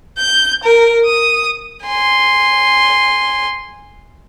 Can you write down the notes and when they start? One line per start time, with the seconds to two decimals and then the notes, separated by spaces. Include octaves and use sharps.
0.18 G6
0.64 A#4
1.06 D#6
1.84 G#5 C6